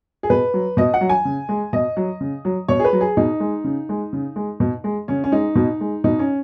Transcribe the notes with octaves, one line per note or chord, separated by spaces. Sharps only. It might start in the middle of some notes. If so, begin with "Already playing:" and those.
G#4
B2 B4
F#3
B2 D#5
F#5
F#3
G#5
C#3
G#3
B2 D#5
F#3
C#3
F#3
B2 C#5
G#4
B4
F#3
G#4
B2 D#4
G#3
C#3
G#3
C#3
G#3
B2
G#3
C#3 C#4
C#4
G#3 D#4
B2
G#3
B2 D#4
C#4